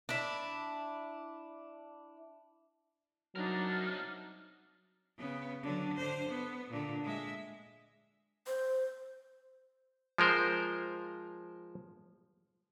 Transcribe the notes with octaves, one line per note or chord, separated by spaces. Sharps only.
D4 E4
C2 F#3 D4 D#4 A#4
C#3 B3
D3 F#3
D3 C5
B3
A#2 D3
G#3 E5
C5
F3 G#3 A#4 C5